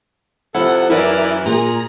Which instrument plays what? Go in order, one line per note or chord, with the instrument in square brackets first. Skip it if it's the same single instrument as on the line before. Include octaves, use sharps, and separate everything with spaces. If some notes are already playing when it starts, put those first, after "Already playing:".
[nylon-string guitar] C3 F3 E4 [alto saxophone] A4 [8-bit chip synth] F#5
[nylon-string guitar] F#2 B4 [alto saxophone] E3 [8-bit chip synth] E4 A#4 D5
[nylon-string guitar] A#2 [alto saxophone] G#4 [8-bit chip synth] A#5